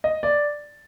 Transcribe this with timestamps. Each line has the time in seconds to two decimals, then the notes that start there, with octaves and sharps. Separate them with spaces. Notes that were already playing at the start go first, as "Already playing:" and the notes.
0.04 D#5
0.23 D5